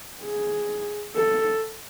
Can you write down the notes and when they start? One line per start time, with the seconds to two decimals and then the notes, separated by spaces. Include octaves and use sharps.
0.23 G#4
1.15 A4